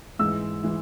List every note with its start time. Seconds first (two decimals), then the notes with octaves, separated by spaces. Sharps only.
0.19 G#2 E3 G#3 E6
0.63 E3 G#3